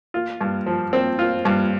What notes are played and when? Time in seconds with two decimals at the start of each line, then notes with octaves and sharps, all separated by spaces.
0.14 F4
0.41 G2
0.66 F3
0.93 C4
1.19 F4
1.45 G2